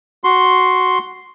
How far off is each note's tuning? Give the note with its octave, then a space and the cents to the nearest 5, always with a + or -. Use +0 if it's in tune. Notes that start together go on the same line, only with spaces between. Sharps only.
F#4 +0 C6 +0